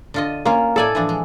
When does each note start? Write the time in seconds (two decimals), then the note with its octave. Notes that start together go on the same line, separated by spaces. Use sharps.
0.14 D3 F4 D#5
0.45 A#3 C#4 F4 F5
0.76 A2 A4 D5 G#5
0.95 E3 F3 D4
1.09 G#3